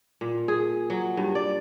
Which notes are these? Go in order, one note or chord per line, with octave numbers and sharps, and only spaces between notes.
A#2
G#4
F#3
G2
D5